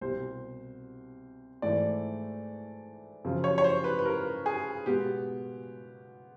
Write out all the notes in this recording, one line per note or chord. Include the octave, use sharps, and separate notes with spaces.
C2 B2 G3 C5
G#2 E3 A3 D5
F#2 C#3 F3
C#5
C#5
C5
B4
B4
A#4
G#4
B2 G#3 B3 G4